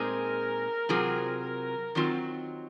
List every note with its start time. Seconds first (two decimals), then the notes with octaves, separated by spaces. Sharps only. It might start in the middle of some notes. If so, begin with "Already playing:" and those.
Already playing: A#2 G#3 C4 D#4 G#4 A#4
0.89 C3 F#3 C4 F4 G#4
1.42 A#4
1.95 D#3 F#3 C4 F4